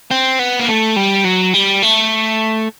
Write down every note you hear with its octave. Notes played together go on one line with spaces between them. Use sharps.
C4
B3
A#3
A3
G3
F#3
G3
A3